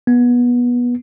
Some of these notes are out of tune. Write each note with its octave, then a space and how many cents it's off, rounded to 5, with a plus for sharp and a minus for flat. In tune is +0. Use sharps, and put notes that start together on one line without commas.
B3 -20